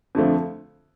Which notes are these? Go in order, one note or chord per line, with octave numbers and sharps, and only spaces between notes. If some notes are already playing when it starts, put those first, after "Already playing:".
F2 D3 F3 A3